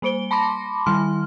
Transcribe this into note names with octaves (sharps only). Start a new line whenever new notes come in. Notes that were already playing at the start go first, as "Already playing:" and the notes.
G3 A#3 C5 D7 G7
A5 B5 C6 D6 A#6
D#3 G3 E4 C6 F6